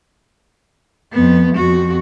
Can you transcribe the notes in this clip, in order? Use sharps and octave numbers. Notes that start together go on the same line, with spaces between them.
F2 B3
F2 F#4